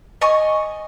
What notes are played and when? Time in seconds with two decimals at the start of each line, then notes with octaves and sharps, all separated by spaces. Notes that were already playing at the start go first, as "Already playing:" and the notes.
0.21 D#5 G#5 C#6